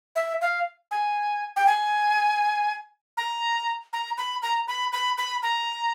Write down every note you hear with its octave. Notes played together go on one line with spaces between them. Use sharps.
E5
F5
G#5
G5
G#5
A#5
A#5
B5
A#5
B5
B5
B5
A#5